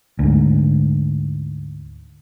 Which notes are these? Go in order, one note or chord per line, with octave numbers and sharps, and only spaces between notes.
D2 G#2